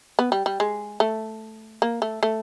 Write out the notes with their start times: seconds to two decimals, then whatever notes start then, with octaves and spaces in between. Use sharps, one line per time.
0.19 B3
0.32 G3
0.46 G3
0.60 G#3
1.00 A3
1.82 A#3
2.02 A3
2.23 A3